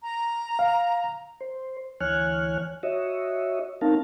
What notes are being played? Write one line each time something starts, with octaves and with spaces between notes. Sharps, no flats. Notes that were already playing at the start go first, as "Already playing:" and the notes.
A#5
F5
C5
D2 E3 C#5 G#5 F6 F#6
F#4 C#5 D#5 E5
C4 C#4 D#4 A#4 F5 A5